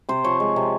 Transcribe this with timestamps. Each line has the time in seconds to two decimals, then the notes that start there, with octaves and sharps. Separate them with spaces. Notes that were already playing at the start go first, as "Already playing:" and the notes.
0.09 C3 C5
0.24 F3 C#5
0.40 G#3
0.56 C3